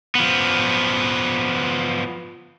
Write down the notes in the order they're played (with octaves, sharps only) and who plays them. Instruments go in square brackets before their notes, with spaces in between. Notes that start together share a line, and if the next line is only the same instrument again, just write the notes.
[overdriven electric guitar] F3 B3